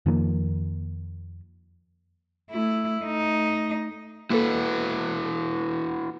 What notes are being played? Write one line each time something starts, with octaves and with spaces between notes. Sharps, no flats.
F2 D#3 F3 A#3
A3 E4
A3 D#4
A#3 E4 F#4 A4 B4